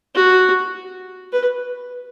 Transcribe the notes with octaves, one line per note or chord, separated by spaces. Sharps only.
F#4
B4